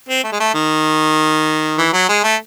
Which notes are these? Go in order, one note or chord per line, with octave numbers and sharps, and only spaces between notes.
C4
A3
G#3
A3
D#3
E3
F#3
G#3
A3